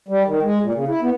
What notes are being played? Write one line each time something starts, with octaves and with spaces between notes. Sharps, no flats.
G3
D#3
G#3
A#2
C#3
E4
B3